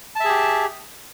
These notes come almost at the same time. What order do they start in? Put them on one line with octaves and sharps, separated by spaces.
A5 E5 G#4 G4